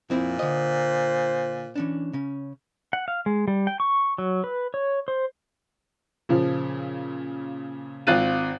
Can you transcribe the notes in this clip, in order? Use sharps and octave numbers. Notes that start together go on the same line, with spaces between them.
F2 A#2 C4 E4
D3 C5 D#5
E3 C#4 D4
C#3 C#4
F#5
F5
G#3
G3
G5
C#6
F#3
B4
C#5
C5
A#2 C#3 F3
G#1 C4 F4 F#6 A6 D#7